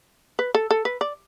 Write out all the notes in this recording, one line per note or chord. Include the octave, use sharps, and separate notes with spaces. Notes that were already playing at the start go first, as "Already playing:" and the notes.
B4
A4
A4
B4
D5